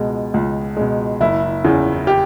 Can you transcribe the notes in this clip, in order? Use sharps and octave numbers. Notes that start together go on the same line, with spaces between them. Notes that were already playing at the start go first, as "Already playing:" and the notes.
Already playing: C#2 B2 G#3
C#2
B2 G#3
F#1 E4
E2 C#3
G4